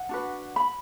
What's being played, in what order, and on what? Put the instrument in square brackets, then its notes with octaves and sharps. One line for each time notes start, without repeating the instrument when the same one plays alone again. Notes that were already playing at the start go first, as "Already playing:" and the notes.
Already playing: [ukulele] F#5
D4 F#4 B4
B5